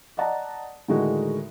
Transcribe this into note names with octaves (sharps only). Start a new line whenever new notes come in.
D5 D#5 F#5 A5 A#5
A2 D3 D#3 G#3 D#4 F#4